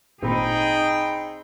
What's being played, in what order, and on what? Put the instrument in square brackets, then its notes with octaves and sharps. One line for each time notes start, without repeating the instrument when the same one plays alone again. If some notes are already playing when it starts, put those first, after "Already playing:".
[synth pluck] G#1 A#2 A4 [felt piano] C4 B5 [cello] D#4 G#4 [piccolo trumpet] G5